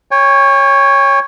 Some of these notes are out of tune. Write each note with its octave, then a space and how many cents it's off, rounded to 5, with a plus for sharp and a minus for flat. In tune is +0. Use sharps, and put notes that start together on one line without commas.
C#5 +0 G5 +45